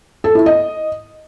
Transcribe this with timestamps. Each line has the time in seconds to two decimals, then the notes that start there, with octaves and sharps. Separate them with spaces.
0.24 A4
0.35 E4
0.46 D#5